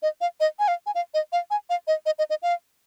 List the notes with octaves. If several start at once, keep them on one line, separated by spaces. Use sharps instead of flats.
D#5
F5
D#5
G#5
F5
G#5
F5
D#5
F5
G#5
F5
D#5
D#5
D#5
D#5
F5